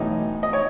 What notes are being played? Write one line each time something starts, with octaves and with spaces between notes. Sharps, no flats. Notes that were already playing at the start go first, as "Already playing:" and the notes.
Already playing: B1 A2 E3 D#4
D#5
C#5